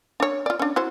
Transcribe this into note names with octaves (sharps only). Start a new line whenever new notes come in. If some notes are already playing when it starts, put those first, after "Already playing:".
D4 C#5
F4 D5
C#4 D4
E4 F#4 C5